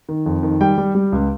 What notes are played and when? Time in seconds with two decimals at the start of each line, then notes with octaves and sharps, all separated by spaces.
0.09 D#3
0.26 F2
0.43 D#3
0.61 G3 G5
0.78 G3
0.95 G3
1.12 C#2